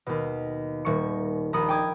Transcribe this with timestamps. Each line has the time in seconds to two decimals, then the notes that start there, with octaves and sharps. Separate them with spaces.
0.06 D#2 B2
0.85 D#1 A#2 C#6 C#7
1.53 A#1 D#2 D#4 B5 D#6 C#7
1.69 G5 G#5 D6 D#6 G#6